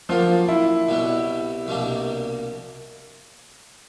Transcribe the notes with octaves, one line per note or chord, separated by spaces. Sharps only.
F3 F#3 A#3 D4 F4
E4
C2 B2 G3 B3
C2 B2 G3 A#3 D4